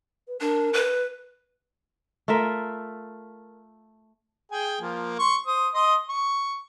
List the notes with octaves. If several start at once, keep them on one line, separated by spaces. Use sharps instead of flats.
B4
D4 A#4
B4
A3 F4 A#4 E5
G#4 G5 G#5
F3 A#3
C6 C#6
C5 D#6
D#5 C6 D#6
C#6